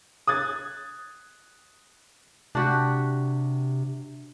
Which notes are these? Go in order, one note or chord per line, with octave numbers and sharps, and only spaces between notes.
D#6 F#6 G#6 A6
C3 D4 F#4 G4